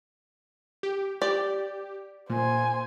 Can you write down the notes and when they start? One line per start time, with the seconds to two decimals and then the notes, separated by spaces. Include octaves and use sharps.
0.83 G4
1.22 G4 D5
2.30 A#2 C5 G#5